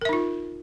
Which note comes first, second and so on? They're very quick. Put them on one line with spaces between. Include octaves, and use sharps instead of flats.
A#4 E5 D#4 F4